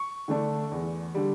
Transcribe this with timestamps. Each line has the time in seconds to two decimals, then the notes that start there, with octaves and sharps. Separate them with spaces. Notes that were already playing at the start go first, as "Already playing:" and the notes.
Already playing: C#6
0.28 D3 A3 D4
0.71 E2
1.14 D3 G3